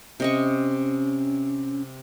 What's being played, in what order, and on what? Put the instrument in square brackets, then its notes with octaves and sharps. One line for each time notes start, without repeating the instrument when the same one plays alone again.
[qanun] C3 D#5 C#6 [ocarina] C#4